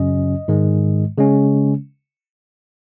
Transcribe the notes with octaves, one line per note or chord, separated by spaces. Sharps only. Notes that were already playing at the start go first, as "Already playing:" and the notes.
Already playing: F#2 C#3 F#3 C#4 D#5
G#2 D#3 G#3
C#3 G#3 C#4